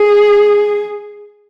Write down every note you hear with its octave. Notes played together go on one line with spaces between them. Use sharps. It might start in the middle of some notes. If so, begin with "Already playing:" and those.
Already playing: G#4